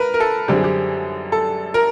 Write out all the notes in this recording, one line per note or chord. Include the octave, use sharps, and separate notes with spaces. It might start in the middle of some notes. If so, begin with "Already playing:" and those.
Already playing: A#4 B4
A#4
A4
F#2 D3 G3 C4 G4
G#4
G4
A4
A#4